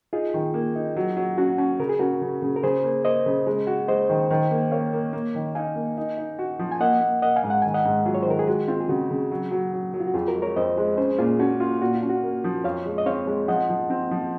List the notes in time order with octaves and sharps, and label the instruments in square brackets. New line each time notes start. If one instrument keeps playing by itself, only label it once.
[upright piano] D#4 [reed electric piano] F4 G#4
[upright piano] D#3
A#3
D#4
F#3
F#3
[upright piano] C#4 [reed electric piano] F#4
[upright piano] C#4
[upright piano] C#3 [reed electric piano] A#4
[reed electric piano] G#4
[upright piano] C#4 [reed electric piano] F#4 A#4
[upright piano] C#3
C#3
[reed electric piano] A#4
[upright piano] C#3 [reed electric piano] G#4 C5
[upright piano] A#3
[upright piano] A#3 [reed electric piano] C5 D#5
[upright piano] C#3
G#3
F#4
[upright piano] G#3 [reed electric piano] C5 D#5
[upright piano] D#3
D#3
A#3
[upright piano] A#3 [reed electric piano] C#5 F5
[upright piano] A#3
A#3
D#3
[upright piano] D#4 [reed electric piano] F5 G#5
[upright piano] A#3
D#4
D#4
F#4
F3
[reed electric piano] G#5
[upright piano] A#3 [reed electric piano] D#5 F#5
[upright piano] A#3
[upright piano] A#3 [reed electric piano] D#5 F#5
[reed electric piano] F5 G#5
[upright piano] G#2
[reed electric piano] F#5
[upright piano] D#3 [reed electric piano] G#5
[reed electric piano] D#5 F#5
[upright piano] G#2
[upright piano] F#3 [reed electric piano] F4 G#4
[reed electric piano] C#5
C5
[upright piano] D#3 [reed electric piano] A#4
[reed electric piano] G#4
[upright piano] G#3 [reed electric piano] F#4
[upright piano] C4 [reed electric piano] F4
[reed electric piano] G#4
[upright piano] C#3 [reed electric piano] F#4
[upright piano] C#3
F#3
F#3
F#3
F#3
[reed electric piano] F4
F#4
[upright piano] F2 [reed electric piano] F4 G#4
[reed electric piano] F#4 A#4
[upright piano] G#3
[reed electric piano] A#4 C#5
[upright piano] F2 [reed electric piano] C5 D#5
[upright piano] G#3
[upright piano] C#4 [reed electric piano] G#4 C5
[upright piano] A#2 [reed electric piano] F4 G#4
[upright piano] C#4 [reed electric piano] F#4
[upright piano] F4
[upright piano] A#2 [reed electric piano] F#4
[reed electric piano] F4
[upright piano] C#4
[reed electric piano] F#4
[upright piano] A#3
F3
[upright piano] F2 [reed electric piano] C#5 F5
[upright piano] G#3
[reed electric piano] D#5
[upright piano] C4 [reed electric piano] C#5 F5
[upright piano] G#3
[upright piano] F3 [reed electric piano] D#5 F#5
[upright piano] F3
C4
F3